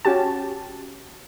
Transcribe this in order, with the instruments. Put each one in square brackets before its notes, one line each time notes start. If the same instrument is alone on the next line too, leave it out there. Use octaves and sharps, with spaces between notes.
[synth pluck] C#4 F#4 G4 A5